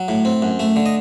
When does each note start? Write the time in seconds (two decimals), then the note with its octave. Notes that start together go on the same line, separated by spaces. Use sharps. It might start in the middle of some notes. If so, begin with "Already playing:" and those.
Already playing: F#3
0.08 A2
0.25 C4
0.42 F#2
0.60 A3
0.76 D3
0.86 D#5